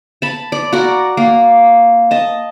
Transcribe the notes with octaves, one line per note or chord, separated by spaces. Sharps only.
A5 B5
D5
F#4 A#4 D5
A#3
D#5 A5